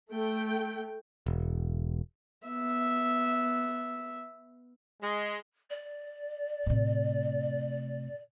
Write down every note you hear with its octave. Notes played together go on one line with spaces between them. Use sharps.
A3 G5
E1
B3 E5
G#3
D5
A2 C3